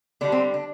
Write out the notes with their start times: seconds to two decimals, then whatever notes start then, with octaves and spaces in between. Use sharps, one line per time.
0.21 D3 G3 D4
0.32 C4
0.54 D4